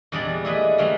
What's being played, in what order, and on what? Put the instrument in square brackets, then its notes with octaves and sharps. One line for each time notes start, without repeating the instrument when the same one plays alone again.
[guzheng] E2 A#2 G3 D4 G#4 D5
A3 E4 G#4 B4 D#5
E3 G3 A3 A#3